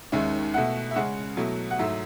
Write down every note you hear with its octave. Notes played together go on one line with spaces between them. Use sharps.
D#2 D#3 G#3 C#4 E5
B2 A3 E4 F#5
E5
C#3 G#3 C#4 F#5
B2 F#3 A3 E4
F#5
G#2 F#3 A3 E4 E5